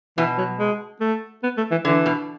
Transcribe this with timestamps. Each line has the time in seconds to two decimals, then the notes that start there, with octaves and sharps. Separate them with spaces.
0.18 B2 E3
0.38 F#3
0.59 G#3
1.00 A3
1.43 B3
1.57 A3
1.71 E3
1.85 D3 E3
2.06 B2